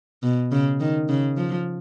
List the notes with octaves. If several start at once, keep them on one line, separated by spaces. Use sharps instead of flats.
B2
C#3
D#3
C#3
F3